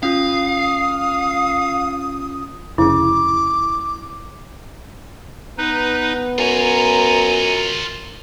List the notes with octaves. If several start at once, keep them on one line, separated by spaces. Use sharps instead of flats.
C#4 F4 F5 D#6
F1 C#3 E4 D6
B3 D#4 B4
F#2 F4 C#5 G#5 A#5